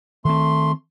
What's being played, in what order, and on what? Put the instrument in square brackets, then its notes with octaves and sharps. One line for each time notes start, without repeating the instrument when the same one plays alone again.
[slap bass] D#3 C4 [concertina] A3 C6